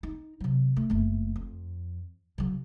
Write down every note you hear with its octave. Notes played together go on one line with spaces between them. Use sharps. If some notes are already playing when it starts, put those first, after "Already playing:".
D#4
C3 F#3
A3
F#1 A3
F2
C#3 F#3